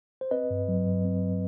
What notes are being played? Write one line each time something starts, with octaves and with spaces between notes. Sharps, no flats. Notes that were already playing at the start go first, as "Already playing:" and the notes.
C5
C4 B4 D#5
G2
F#3
G2
C4